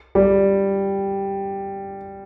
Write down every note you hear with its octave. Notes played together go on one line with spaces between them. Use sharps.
G3